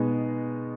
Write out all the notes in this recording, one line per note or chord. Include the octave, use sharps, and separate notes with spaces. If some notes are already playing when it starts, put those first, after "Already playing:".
Already playing: B2 G#3 B3 D#4